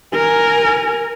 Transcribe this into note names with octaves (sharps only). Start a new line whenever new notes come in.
A#4 G#5